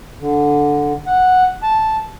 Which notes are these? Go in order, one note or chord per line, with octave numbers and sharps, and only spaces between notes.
D3
F#5
A5